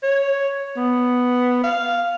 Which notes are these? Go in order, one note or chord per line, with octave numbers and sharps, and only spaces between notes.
C#5
B3
F5